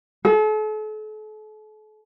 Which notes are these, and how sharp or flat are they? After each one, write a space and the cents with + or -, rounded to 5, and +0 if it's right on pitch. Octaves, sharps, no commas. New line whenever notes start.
A4 -40